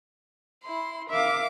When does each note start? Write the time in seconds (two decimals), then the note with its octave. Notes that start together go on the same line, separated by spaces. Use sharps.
0.63 E4 C6
1.10 A#4 E5 F5 D6